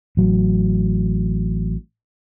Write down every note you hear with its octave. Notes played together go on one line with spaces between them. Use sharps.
A1 F#3